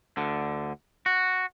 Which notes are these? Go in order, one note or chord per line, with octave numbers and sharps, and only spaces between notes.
D2 D3
F#4